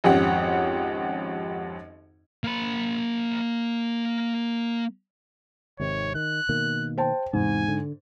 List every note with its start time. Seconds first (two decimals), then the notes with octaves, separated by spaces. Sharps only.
0.04 G#1 F2 C#4 G4 F#5
2.44 A#3 B5
5.80 G#1 C3 D#3 C#5
6.15 D#3 F#6
6.49 B2 D#3 A#3
6.98 C5 G5 A5
7.33 E2 G#2 C3 G#5
7.68 D3